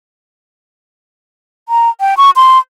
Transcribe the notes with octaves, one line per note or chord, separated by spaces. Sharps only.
A#5
G5
C#6
C6